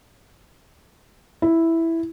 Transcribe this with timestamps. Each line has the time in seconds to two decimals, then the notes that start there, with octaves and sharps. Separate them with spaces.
1.42 E4